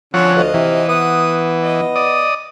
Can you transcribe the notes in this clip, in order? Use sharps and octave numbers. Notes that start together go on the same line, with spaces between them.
D3 F3 C4 C#4 C#5 F#5
D2 F4 D#5
C3 E3
B3 F#5 D#6
D#5
D5 D#6